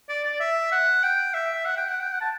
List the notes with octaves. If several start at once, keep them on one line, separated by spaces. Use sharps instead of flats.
D5
D5
E5
F#5
G5
E5
F#5
G5
F#5
G5
F#5
A5